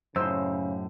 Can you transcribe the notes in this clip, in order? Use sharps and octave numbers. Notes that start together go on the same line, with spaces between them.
F#2 A2 C#3 D#4 C5 E6